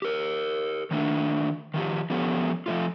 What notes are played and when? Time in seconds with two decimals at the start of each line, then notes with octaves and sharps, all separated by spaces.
0.02 G4 A#4
0.91 D#3 A3 D4
1.74 D#3 F3 G4
2.10 F3 B3 C#4 G4 A4
2.66 F3 A3 F4